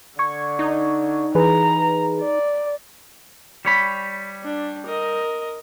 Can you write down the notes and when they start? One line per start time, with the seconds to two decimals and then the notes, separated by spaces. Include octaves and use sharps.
0.19 D3 C#6 G#6
0.59 D#4
1.35 E3 G#4 B4 A#5
2.20 D5
3.65 G3 C#5 B5
4.43 D4
4.86 A#4 D#5